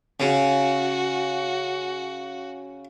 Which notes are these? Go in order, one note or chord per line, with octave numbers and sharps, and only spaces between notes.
C#3 F#4